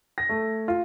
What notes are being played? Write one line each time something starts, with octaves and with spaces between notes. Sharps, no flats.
A#6
A3
F4